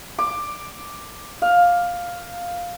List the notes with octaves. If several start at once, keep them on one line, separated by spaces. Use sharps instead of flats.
D6
F5